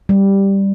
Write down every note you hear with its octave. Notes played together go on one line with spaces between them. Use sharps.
G3